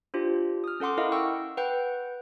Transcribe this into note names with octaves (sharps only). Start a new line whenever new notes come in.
D4 F4 G4 C5
D#6 F6
C#4 A4 F#5 C6 D6
E4 A#4 D#5 F5 F#5
G5 C#6 E6
B4 F#5 G5 G6